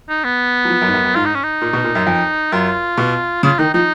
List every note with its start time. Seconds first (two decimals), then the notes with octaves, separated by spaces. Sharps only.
0.09 D#4
0.24 B3
0.65 F#3
0.69 F3
0.81 F#2
0.88 G#2
0.93 F#2
1.04 F#2
1.15 G#2 F4
1.26 D#4
1.35 C#4
1.44 D#4
1.62 A#2
1.73 B2
1.84 A#2
1.95 F#2
2.07 F2
2.52 F#2 F4
2.97 B2
3.43 C#3 F4
3.59 D#3 D#4
3.74 F3 D#4